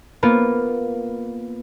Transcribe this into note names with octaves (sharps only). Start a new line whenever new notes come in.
A#3 B3 F4